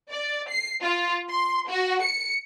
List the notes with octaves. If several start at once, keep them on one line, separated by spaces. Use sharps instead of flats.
D5
C7
F4
C6
F#4
C#7